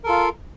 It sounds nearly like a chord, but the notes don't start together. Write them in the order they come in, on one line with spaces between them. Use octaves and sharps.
A#4 A4 F4 F5